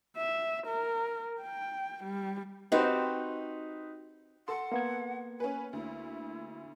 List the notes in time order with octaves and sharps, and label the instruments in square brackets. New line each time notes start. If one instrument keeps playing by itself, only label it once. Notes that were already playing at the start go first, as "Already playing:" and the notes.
[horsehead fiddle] E5
A#4
G5
G3
[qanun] C4 F#4 G4 [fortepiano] D#4 B4 C5
[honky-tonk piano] A4 C6 [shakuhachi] F#5
[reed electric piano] A#3 B3 G#6
[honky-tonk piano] C#4 B4 [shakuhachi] G#5
[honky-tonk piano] D2 [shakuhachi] E4